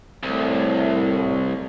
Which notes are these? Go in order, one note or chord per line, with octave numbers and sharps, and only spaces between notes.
C2 A2